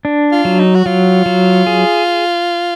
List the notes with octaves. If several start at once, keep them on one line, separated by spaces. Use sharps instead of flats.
D4
F4
F#3
D#4
F#4
F#3 F4
F#3
G#4